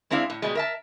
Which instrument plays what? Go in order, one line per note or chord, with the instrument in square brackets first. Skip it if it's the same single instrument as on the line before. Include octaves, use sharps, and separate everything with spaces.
[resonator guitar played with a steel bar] G#3 C4 D4 E4 F5
A2
B2 G3 G#3
A#4 E5 A5